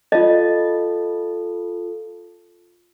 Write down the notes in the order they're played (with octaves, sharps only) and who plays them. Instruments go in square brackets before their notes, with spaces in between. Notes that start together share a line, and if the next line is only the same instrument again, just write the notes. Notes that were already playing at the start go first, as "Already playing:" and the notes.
[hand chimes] F4 A4 [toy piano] D#5